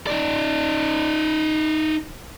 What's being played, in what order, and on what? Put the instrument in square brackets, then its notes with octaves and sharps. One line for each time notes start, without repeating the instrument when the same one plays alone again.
[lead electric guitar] D#4 D5